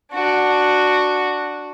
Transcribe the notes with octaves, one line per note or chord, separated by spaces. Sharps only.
D4 F#4